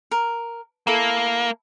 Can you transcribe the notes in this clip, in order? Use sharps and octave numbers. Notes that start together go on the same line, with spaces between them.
A#4
A#3 E4 A4